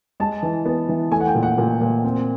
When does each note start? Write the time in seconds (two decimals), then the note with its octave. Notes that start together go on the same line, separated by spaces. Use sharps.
0.20 G#3 A5
0.42 E3
0.65 B3
0.89 E3
1.12 A3 G#5
1.20 F#5
1.27 G5
1.35 A#2
1.43 F#5
1.58 A#2
1.81 A#2
2.04 C4